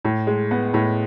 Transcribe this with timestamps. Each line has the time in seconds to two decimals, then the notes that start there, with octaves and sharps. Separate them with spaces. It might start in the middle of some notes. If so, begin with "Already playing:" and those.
0.05 A2
0.27 G#3
0.51 B3
0.74 A2